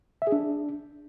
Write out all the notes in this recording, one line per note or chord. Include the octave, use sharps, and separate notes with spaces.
E5
G#4
D4